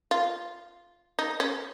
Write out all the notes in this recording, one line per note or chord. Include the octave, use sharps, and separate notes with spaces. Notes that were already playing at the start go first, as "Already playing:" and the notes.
F4
D#4
C#4